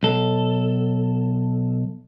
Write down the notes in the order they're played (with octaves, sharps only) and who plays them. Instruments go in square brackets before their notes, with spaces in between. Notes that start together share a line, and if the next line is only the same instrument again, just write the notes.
[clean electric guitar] B1 A4